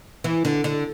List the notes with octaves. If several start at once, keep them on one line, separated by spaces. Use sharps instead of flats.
E3
D3
D3